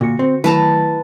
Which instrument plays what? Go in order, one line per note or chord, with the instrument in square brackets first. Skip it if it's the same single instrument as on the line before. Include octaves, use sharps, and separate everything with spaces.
[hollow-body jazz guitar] A#2 [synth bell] D3 F#4 C#7
[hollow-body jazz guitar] C4
[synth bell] D#3 F#3 A3 [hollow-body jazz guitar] E4 [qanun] B4 A5 A#5